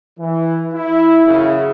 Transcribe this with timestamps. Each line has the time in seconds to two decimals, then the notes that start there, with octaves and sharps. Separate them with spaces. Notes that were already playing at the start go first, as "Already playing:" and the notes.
0.19 E3
0.74 E4
1.26 F#2 C#3